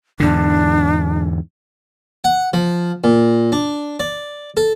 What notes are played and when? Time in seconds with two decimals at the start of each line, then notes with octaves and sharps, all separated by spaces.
0.20 E2 G#2 D3 D4
2.24 F#5
2.53 F3
3.04 A#2
3.52 D4
4.00 D5
4.57 A4